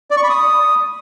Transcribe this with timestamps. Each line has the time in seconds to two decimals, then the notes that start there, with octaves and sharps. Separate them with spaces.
0.11 D5
0.17 C#6
0.23 B5
0.30 D#6